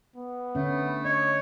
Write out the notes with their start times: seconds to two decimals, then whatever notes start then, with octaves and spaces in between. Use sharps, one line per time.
0.16 B3
0.55 D3 A3 C#4
1.05 C#5 D#5